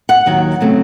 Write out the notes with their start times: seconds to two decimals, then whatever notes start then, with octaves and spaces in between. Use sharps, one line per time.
0.09 F#5
0.26 D#2 D#3 F#3
0.61 C#3 F#3 A3 C4